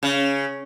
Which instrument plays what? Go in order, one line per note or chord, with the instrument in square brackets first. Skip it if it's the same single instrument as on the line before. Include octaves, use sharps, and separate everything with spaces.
[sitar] C#3